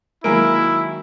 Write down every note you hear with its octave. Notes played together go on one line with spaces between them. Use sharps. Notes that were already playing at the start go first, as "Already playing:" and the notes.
D#3 F#3 G#3 A#3 E4 G#5 D7